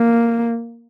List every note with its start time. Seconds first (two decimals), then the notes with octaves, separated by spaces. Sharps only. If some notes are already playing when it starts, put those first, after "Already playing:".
Already playing: A#3